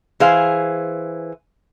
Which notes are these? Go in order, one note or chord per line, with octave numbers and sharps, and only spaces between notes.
E3 G#4 C5 F5